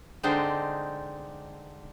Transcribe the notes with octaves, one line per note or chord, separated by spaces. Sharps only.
D3 G#3 C4 D4 D#4 C5